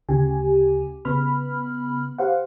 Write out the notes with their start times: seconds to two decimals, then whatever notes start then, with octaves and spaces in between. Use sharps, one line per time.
0.09 D2 C#3 G4 G#5
1.05 C#3 B3 B5 F6
2.18 G4 C5 F5 F#5